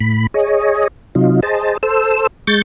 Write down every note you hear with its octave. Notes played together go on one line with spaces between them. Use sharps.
A2 B5
G#4 C#5 D#5
C3 F#3 D#4 F4
G#4 C5 D#5 A5
A4 C5 E6
G#3 C#6 G6 A6